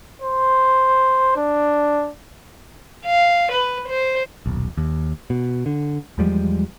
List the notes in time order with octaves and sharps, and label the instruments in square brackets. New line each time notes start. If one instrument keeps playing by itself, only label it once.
[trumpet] C5
D4
[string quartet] F5
B4
C5
[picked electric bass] D#1 B1
D#2
B2
D3
E2 F3 G3 G#3